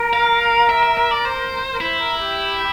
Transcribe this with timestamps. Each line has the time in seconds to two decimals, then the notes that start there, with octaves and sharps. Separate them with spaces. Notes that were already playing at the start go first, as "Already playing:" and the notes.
Already playing: A#4
0.13 F5
0.69 E5
0.83 E5
0.97 E5
1.11 D5
1.25 C5
1.72 A#4
1.80 E4 C5
1.99 A#4
2.18 G4